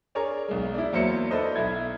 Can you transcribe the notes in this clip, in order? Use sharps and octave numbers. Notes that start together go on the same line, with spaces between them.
D4 G#4 A#4 C#5
B1 G#3
D4 E4
E2 F#3 A#3 C5 E5 C#7
D4 E4 A4 B4 C5 D#5
B1 E4 G#6